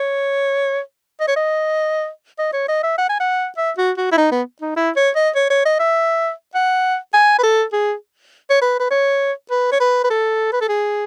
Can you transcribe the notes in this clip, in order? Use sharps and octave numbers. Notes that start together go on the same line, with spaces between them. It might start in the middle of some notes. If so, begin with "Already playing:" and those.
Already playing: C#5
D#5
C#5
D#5
D#5
C#5
D#5
E5
F#5
G#5
F#5
E5
F#4
F#4
E4
D#4
B3
D#4
E4
C#5
D#5
C#5
C#5
D#5
E5
F#5
G#5
B4
A4
G#4
C#5
B4
B4
C#5
B4
C#5
B4
B4
A4
B4
A4
G#4